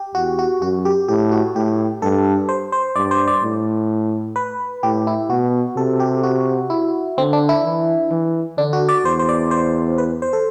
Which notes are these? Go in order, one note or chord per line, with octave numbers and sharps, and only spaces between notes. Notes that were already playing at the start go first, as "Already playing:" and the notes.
Already playing: G4
E2 F#4
F#4
F#2 F#4
G4
A2 G4
F#4
A2 G4
G2 A4
C5
C5
G2 D5
C5
D5
A2
B4
A2 G4
E4
B2 F#4
C3 A4
G4
F#4
E4
D3 C4
D4
E4
E3
E3
D3 D4
F#4
D5
E2 C5
C5
D5
C5
B4
C5
A4